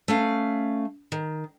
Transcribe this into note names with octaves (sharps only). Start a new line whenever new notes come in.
A3 C#4 F5
D#3